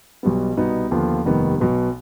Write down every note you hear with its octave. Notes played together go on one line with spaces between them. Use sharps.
B1 B2 G3 B3
C2 B2 B3 D#4
D#2 D3 F3 B3 F4
F1 D#2 D#3 G3 B3
B1 B2 B3